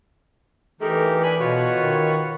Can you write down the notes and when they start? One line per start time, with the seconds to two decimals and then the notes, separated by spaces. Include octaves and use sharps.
0.81 E3 A3 D#4 G4 A#4
1.23 D4 G#5 B5
1.40 B2 F4 F#4 B4 C#5
1.75 D#3